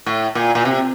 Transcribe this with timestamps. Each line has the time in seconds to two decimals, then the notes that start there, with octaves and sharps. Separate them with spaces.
0.06 A2
0.35 A#2
0.55 A#2
0.65 C3